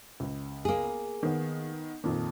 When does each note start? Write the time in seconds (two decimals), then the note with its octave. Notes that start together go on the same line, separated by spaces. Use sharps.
0.20 C#2
0.65 A#3 G#4
1.23 D#3 B3
2.04 F2 A#2 D#3